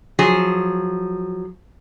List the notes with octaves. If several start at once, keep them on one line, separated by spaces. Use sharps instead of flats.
F3 F#3 G#4